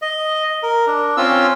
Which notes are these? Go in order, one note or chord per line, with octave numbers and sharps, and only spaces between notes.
D#5
A#4
D4
C4 C#4 F4 E6